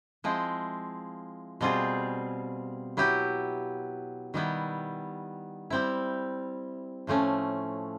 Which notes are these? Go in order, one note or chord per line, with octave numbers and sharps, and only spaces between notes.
F3 G#3 C4 E4
B2 G3 C4 F4 G#4
F#3 B3 E4 G4
D#3 G3 B3 E4
G3 C4 E4
A2 F3 A3 C#4